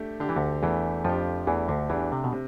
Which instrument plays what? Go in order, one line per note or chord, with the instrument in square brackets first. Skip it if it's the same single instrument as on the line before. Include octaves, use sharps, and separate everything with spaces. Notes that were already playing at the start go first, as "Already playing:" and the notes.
Already playing: [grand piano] A3 D4 G4
[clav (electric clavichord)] D3 [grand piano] D4 G4
[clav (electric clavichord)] E3
D2 D3
[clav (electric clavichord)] E2 E3 [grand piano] A3
[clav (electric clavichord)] F2 F3 [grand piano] D4 G4
[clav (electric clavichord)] E2 E3 [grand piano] A3
[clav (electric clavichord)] D2 D3
[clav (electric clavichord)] E2 E3 [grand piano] D4 G4
[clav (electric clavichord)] C3
B2
[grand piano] C3